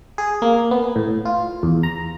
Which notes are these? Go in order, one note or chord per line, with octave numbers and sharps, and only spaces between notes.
G#4
A#3
B3
A2
F4
E2
A#5